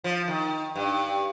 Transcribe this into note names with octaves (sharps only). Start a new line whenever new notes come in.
F3
D#3
G2